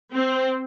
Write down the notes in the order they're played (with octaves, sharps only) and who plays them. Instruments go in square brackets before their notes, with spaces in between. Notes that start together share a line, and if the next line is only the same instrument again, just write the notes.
[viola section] C4